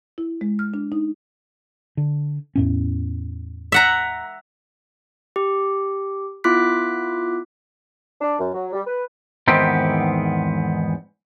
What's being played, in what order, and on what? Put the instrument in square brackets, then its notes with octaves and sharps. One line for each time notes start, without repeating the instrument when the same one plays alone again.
[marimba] E4
G#3
F6
D4
D#4
[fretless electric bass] D3
E2 A2 C#4
[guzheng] E5 F#5 A#5
[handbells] G4
B3 E4 F4 D6 F#6 B6
[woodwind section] D4
F#2
F#3
G3
B4
[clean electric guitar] E2 G#2 D#3 B3 C4 G4